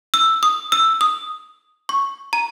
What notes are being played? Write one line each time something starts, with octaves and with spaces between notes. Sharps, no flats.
E6
D#6
E6
D#6
C#6
A#5